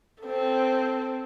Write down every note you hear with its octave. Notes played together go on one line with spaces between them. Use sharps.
C4 A4